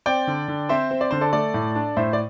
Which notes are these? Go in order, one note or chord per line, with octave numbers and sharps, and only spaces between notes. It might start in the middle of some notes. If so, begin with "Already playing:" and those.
C4 D5 G5
D3
D3
C4 C5 E5
C4
D5
D3 C5
A4 D5
A3 A4 D5
A2
D4
A2 C5 E5
D5